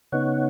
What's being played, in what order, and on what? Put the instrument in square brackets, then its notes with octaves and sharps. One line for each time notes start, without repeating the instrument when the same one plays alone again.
[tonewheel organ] C#3 B3 D#4 C#5 F#5